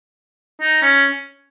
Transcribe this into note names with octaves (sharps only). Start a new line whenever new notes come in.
D#4
C#4